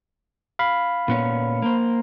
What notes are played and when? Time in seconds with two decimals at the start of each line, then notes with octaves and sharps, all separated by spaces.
0.59 F5 B5
1.08 A#2 B3 C#4
1.62 A#3 C5